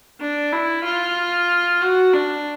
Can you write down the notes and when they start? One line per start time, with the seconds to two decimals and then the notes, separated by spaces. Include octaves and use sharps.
0.21 D4
0.52 E4
0.84 F4
1.81 F#4
2.13 D4